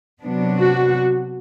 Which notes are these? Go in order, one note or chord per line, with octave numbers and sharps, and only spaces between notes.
C3 F#3 B3 D4
F#4